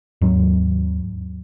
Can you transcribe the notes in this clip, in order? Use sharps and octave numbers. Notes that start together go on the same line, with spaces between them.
D#2 G#2 F#3